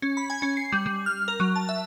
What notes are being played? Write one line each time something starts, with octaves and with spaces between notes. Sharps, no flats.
C#4
B5
G#5
C#4
C7
G3
G3
F6
A#4
F#3
A5
E5